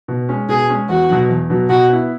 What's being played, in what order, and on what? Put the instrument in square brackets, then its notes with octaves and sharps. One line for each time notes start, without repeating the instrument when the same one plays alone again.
[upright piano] B2
G#3 C#4
[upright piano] B2 [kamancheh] G#4
[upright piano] G#3 C#4
[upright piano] E2 [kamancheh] F#4
[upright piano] B2 F#3
E2
B2 F#3
[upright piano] B2 [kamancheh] F#4
[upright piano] B3 E4